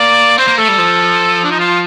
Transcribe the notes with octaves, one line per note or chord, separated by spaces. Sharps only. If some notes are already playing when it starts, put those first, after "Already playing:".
Already playing: A#3 D5
C4 C5
A#3
A3 A4
G3
F3
D4
D#4
F4